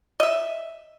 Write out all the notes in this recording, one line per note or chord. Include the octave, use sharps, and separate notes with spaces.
D#5 E5